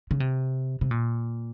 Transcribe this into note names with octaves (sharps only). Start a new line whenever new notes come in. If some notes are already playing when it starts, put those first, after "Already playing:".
C#3
C3
C3
A#2